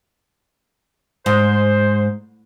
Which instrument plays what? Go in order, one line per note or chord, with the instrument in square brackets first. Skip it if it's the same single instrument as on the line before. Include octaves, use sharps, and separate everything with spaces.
[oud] G#2 [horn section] C5